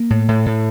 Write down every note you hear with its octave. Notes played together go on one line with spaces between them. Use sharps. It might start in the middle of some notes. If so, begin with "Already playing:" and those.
Already playing: A#3
A2
A2
A2